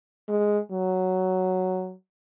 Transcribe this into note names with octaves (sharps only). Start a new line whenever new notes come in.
G#3
F#3